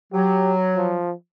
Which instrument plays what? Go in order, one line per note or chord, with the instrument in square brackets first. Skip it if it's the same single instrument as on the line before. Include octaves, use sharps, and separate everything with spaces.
[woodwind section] F#3 [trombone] G4
[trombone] F3